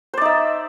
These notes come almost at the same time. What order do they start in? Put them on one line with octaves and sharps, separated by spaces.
C5 D5 D#4 E5